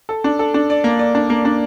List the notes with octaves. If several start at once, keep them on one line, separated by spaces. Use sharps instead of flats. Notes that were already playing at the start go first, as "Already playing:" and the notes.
A4
D4
A4
D4
D5
A#3
D5
D4
A#3
D4